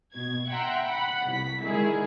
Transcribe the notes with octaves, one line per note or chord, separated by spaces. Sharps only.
B2 G#6
E5 F#5 G5 A#5 C6
F#5 B5
C2 B6
D3 D#3 G#3 E4 G#4